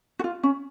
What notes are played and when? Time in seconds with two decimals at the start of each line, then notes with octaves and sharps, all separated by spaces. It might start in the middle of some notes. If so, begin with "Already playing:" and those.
0.19 F#4
0.24 F4
0.43 C#4